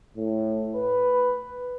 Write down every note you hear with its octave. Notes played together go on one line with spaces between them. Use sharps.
A2
B4